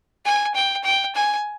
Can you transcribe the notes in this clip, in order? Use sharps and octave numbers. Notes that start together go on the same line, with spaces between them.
G#5
G5
G5
G#5